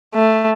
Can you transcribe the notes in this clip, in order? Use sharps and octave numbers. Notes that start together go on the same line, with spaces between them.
A3